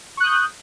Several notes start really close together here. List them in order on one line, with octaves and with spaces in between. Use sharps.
C#6 F#6 D#6 G6